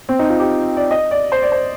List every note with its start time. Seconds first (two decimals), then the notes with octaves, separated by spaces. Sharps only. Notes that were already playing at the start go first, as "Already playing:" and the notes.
0.09 C4
0.19 D#4
0.29 F4
0.39 G4
0.77 D5
0.91 D#5
1.11 D5
1.32 C5
1.43 D5
1.52 C5